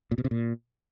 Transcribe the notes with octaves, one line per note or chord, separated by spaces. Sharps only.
A#2
B2
C3
A#2